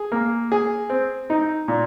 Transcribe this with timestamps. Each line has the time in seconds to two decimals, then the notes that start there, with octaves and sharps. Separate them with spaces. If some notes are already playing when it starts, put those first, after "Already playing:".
Already playing: G#4
0.12 A#3
0.52 G#4
0.90 C4
1.30 D#4
1.68 A#2